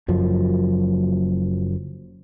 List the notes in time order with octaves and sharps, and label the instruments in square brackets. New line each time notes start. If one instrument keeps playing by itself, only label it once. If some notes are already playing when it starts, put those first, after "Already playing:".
[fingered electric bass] F#1 F#2 F3